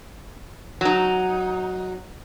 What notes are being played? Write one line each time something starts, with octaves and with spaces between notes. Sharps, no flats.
F#3 D#4